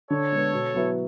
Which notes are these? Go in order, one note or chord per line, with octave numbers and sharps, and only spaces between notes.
D3 A4 C#5
G#3 B3
B2
F#3 B3 E4